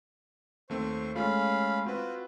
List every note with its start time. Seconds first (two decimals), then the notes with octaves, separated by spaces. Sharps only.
0.70 D#2 A3 C4 C5 C#6
1.15 G#3 A3 C#4 F4 F5 B5
1.86 C4 F4 F#4 B4